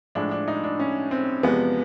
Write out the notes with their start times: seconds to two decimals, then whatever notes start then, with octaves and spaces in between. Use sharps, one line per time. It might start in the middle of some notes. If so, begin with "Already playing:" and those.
0.15 A2 F3 G#3 D4
0.31 D4
0.48 D#4
0.64 D4
0.80 C#4
1.11 C4
1.43 E2 C3 F3 G#3 B3